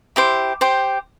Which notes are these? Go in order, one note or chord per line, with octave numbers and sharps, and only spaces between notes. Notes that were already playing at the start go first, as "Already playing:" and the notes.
E4 G4 C5
G4 C5